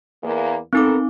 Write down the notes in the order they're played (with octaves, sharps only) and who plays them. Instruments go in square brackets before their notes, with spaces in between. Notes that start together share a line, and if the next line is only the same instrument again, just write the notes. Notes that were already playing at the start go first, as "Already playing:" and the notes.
[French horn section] E2 A#3
[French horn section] B3 A4 A#4 [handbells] C4 D#4 D6